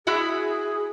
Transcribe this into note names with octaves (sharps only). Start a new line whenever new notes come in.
E4 F#4 G#4 E5